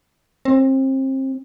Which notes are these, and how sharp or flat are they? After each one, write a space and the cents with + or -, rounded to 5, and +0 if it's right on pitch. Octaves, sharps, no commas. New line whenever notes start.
C4 +30